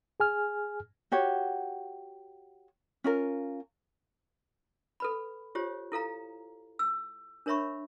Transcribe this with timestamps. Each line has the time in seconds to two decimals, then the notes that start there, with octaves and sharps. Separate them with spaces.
0.20 G#4 G#5 F6
1.12 F#4 G4 C#5
3.04 C#4 F4 A#4
5.00 A4 B4 B5
5.55 F4 G4 C5 C#5
5.92 E4 A4 F5 A#5
6.79 E6
7.46 D4 A#4 C#5 E5 B5 C#6